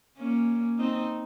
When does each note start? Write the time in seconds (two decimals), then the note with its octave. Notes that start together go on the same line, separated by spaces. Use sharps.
0.18 A#3 C#4
0.79 C4 D#4